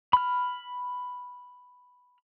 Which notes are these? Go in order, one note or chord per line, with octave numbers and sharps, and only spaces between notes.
B5 F6